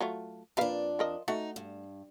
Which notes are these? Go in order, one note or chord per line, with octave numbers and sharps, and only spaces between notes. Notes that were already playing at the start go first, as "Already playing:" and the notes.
F#3 A3 F4
F2 A#3 D4 B4 F5
F3 A#4 D#5
A3 D#4 F#4 F#5
G2